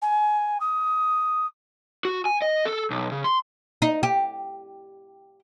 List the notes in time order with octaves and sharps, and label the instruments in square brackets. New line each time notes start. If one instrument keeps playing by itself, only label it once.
[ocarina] G#5
D#6
[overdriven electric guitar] F#4
G#5
D#5
A4
B1
C#3
C6
[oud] D#4
G4